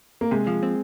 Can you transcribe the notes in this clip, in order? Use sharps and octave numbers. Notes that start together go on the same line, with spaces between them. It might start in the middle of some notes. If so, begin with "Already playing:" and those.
A#3
C3 G#3
F3
C4